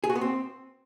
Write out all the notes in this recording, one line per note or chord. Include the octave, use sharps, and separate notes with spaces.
G#4
F#4
B3
C4